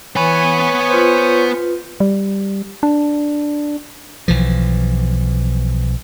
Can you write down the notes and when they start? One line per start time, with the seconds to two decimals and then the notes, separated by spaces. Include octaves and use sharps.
0.16 E3 B3 C#5 G#5 B5
0.89 F4 B4 C5
2.00 G3
2.83 D4
4.28 B1 E3 F3